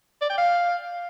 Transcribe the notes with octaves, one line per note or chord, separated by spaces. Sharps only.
D5
G5
F5